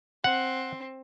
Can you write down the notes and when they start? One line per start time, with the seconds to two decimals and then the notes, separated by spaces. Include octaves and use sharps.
0.24 C4 F#5